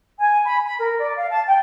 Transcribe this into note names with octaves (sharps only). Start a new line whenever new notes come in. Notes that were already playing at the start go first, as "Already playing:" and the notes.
G#5
B5
B5
A#4
D5
F5
A5
G5